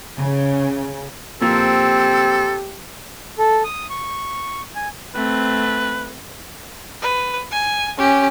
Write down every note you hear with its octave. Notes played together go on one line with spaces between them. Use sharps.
C#3
A#2 F3 A#3 C4 G4 A4
A4
D#6
C#6
G#5
A3 C4 B4
B4
G#5
C#4 G4